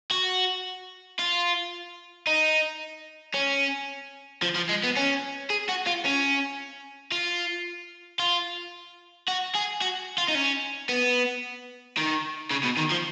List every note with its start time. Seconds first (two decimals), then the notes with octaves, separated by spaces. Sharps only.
0.11 F#4
1.19 F4
2.27 D#4
3.34 C#4
4.42 F3
4.56 F3
4.69 G#3
4.83 B3
4.97 C#4
5.50 G#4
5.69 F#4
5.86 F4
6.05 C#4
7.12 F4
8.19 F4
9.28 F#4
9.55 G#4
9.81 F#4
10.18 F4
10.28 D#4
10.35 C#4
10.89 B3
11.97 D#3
12.51 C#3
12.64 B2
12.78 D#3
12.92 F3